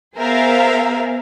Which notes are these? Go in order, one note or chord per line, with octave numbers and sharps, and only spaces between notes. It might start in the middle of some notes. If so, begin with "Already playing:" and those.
B3 G#4 A#4 C5 E5 F5